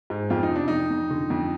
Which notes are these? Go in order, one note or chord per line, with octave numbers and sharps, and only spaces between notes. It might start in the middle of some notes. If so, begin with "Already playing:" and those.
G#2
F2 F4
D#4
C3 D4
F2 D#4
F2
D3
F2